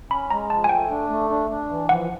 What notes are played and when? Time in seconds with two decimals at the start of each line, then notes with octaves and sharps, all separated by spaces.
0.10 C#4 B5
0.30 G#3 A#5
0.50 F3 A5
0.64 G#5
0.69 A3 G5
0.90 D4
1.10 A3
1.30 D4
1.49 D4
1.70 E3
1.89 F3 F#5